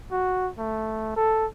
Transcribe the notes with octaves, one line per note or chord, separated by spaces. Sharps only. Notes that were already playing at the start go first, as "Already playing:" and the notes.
F#4
A3
A4